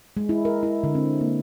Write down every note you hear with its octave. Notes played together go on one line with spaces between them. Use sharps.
G#3
E4
A#4
E4
D3
C4
A#3